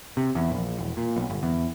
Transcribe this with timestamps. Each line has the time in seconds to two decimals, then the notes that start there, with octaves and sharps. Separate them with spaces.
0.17 C3
0.35 E2
0.50 A#1
0.79 E1
0.97 A#2
1.16 B1
1.30 G1
1.43 E2